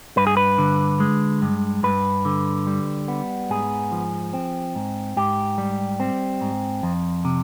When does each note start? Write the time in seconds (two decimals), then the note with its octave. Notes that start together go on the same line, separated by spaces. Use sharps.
0.17 G2 B4
0.27 G#4
0.37 B4
0.58 D3
1.00 G#3
1.42 G2
1.83 G2 B4
2.25 D3
2.67 G3
3.08 B3
3.50 G#2 G#4
3.92 F3
4.33 C4
4.75 G#2
5.16 G#2 G4
5.58 G3
6.00 C4
6.41 G#2
6.83 F2
7.25 C3